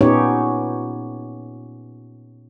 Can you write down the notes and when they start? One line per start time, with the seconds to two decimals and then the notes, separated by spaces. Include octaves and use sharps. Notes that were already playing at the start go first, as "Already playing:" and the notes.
0.01 A#2 B3 C#4 D#4 G4 C#5